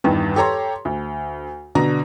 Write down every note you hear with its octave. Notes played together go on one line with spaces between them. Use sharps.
E2 G2 D#3
G4 A4 C#5 A#5 C6
D2
B2 D3 D4 A#5 A#6